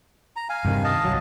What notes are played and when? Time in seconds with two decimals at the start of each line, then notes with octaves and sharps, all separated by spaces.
0.36 A#5
0.49 F5 G#5
0.65 G2 C3 D#3
0.84 D#5 F5 A5
1.05 C2 F#3